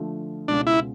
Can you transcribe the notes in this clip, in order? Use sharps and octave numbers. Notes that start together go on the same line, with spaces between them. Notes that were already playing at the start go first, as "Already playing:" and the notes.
Already playing: D3 F3 A3
C#2 B2 G#3 C#4 D4 F4
E4